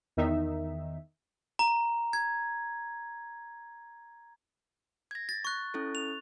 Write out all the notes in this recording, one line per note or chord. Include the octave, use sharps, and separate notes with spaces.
E2 D#3 D#4 E5
A#5
G#6
G#6 A#6
A6
C#6 F#6
C#4 E4 A4
F7